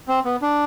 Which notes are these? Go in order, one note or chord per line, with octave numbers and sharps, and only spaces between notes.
C4
B3
D4